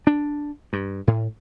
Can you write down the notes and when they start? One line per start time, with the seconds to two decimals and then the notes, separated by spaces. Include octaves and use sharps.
0.07 D4
0.73 G2
1.07 A2